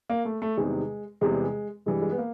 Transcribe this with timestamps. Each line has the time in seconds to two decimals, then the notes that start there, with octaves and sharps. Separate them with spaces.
0.10 A#3
0.25 A3
0.42 A3
0.57 E2 C3 D#3 G3 G#3
1.21 E2 C3 E3 G3 G#3
1.86 G2 E3 G3 G#3
2.02 G#3
2.11 B3
2.18 A#3